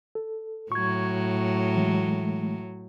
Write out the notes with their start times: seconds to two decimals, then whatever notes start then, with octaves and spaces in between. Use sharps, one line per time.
0.15 A4
0.72 A2 F#3 C#6 G#6
1.76 E3 G#3 A3